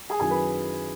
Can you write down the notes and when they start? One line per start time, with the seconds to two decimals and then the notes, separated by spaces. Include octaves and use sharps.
0.10 G#4 G#5
0.20 F#2 D#3 F#3 C#4 E4 G#4 G#5
0.30 B4 B5